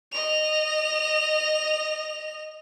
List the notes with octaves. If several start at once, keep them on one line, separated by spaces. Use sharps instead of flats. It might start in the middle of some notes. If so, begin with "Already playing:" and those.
D#5 F7